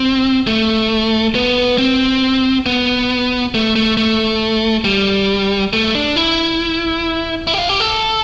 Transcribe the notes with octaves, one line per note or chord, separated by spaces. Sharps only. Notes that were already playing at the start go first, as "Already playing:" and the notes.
Already playing: C4
A3
B3
C4
B3
A3
A3
A3
G3
A3
D4
E4
E4
G4
F4
G4
A4